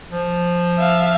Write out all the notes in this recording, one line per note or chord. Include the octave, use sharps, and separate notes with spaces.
F3
E5 F5